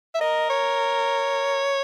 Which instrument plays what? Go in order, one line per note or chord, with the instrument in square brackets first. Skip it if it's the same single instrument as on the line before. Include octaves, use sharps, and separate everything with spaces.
[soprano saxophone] E5
[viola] A#4 [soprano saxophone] D#5
[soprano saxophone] C#5